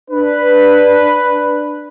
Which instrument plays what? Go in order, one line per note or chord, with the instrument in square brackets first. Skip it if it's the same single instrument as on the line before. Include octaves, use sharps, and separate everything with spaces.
[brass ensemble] D4 B4